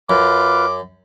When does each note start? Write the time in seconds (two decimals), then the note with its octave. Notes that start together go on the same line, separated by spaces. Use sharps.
0.10 F#2 F4 B4 D6